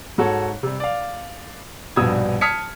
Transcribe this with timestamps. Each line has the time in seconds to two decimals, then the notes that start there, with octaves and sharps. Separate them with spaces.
0.18 G#2 F#4 A4 C#5
0.63 C3 G3
0.80 D5 F5
1.96 A#1 G2 B2 D#6 E6 G#6
2.41 A5 D#6 F6 G#6 B6 C#7